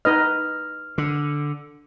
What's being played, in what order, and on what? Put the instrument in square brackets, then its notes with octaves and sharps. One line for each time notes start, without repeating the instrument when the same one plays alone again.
[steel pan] D#4 B4 D#5 [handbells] F6
[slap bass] D3